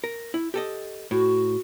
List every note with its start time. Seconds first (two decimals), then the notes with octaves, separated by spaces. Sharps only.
0.04 A#4
0.34 E4
0.54 G4 A4 D#5
1.11 A2 F#4